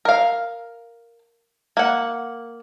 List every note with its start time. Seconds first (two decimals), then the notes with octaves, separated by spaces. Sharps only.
0.05 A#4 F5
1.77 A#3 F#5